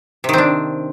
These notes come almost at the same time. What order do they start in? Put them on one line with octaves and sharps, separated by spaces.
C3 D#3 C4 D4